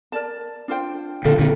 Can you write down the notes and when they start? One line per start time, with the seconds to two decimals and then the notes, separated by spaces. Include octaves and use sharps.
0.12 A#4 D5 A5
0.68 D4 F4 C5 G5
1.24 A#2 D3 D4 F4 A4
1.39 A#2 D3